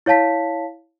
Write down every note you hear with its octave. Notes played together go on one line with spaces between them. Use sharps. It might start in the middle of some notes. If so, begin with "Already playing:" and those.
E4 C#5 F5 A5 B6